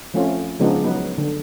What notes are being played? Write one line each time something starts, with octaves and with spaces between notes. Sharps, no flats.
F3 A3 C4 C#4 F4
C#3 F3 G#3 B3 D4 D#4
F#3 B3 D#4 B4
D3